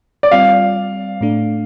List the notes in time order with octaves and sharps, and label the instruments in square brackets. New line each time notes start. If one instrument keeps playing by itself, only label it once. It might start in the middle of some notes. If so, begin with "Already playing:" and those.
[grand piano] D5
[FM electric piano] G3 C4 F4 [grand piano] F5
[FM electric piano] A2 A3 D4